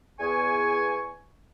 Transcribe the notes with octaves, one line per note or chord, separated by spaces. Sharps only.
E2 G#5 C#6